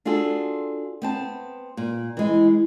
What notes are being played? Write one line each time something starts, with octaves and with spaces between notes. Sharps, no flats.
D4 F4 F#4 G#4 A4
B3 C4 A5
A#2
E3 G#3